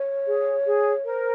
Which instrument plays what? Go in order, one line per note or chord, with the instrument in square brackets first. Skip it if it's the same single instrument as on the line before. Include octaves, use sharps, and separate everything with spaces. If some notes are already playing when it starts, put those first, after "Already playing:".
Already playing: [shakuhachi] C#5
[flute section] G#4
G#4
[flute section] A#4 [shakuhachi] C#5
[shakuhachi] C5